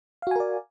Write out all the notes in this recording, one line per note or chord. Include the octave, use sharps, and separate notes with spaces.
F#4 A#4 D5 F5 G#5